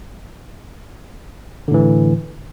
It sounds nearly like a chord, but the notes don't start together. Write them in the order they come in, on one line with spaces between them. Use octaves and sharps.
D3 A2 E3